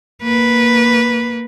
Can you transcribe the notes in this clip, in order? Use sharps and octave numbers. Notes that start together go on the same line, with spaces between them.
A#3 B4